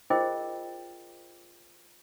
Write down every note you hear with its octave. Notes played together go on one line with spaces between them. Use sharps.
F4 G#4 A#4 C5 D#5 G5